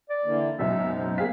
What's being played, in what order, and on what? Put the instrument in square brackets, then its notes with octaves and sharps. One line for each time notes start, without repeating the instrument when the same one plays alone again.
[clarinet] D5
[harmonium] D3 E3 A#3
[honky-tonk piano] F#1 B1 F#2 [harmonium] G#3 D#4 [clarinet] E5
[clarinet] C5
[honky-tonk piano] A#3 G#4 B6 [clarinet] F5